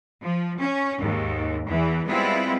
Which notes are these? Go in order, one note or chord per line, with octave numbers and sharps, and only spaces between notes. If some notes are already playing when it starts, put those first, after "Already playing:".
F3
C#4
D#2 G#2
E2 E3
G3 G#3 B3 C4 E4 F4